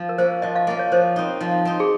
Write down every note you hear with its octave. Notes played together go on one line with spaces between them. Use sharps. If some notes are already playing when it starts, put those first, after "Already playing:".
Already playing: F3
A#4
A#3 C#4 C5
F3 D#5
F5
A#3 C#4 D#5
C#5
F3 C5
C4 D#4
F3
C4 D#4
G#4